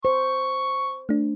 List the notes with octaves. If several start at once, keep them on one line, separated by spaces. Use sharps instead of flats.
C5 C#6
A3 D4